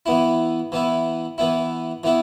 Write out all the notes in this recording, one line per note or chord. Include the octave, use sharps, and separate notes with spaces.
E3 B3 E4
E3 B3 E4
E3 B3 E4
E3 B3 E4